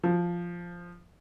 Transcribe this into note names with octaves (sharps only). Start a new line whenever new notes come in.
F3